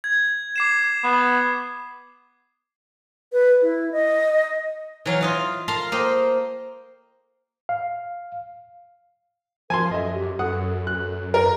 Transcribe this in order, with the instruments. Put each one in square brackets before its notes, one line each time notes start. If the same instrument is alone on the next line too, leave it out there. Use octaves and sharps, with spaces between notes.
[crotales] G#6
D6 C7 E7
[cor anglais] B3
[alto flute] B4
E4
D#5
[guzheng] E3 F#3 F5
F4 D#5 F5
A#4 F5 A5 A#5 C6
A#3 C5 D#5 G5
[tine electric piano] F5
[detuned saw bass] F3 [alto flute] A#4 [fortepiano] G#5 A5 C6
[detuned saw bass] F#2 [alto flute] A4 [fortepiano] D#5 E5
[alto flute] G4
[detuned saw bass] F#2 [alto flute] A4 [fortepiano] F#5 D#6
[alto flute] A4 [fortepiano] F#6
[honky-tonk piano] A#4